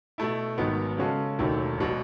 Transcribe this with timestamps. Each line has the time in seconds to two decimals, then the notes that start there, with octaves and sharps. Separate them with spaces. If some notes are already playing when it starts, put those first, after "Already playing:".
0.18 B2 A3 E4
0.58 G#1 G#2 D#3 F#3 B3
0.98 C#3 G#3 C#4 F#4 A4
1.38 E1 D#2 D#3 F#3 A3
1.78 E1 B2 F#3